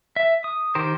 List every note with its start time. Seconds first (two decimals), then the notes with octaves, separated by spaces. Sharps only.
0.16 E5
0.44 D#6
0.75 D#3 G4 A#4 C5